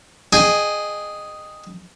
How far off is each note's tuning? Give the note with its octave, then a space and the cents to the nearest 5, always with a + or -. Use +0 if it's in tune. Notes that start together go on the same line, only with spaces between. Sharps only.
G#4 +0 D#5 -20 G5 +0